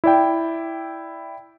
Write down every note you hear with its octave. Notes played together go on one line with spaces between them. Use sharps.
E4 D5 G5